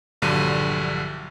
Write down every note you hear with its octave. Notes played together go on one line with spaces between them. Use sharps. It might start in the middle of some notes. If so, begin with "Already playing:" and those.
A#1 G2 D3 F#3 D#7